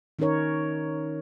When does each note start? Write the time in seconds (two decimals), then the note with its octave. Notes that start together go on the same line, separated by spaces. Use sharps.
0.19 D#3 C#4 D#4 A#4 C#5